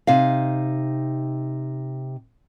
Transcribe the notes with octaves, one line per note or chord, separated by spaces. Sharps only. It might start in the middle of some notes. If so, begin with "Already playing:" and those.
C3 D#4 F5